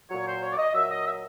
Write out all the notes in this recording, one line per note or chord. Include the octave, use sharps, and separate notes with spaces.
A#2 F#3 C#5
C5
C#5
D5
D#5
A#2 F#3 E5
D#5
E5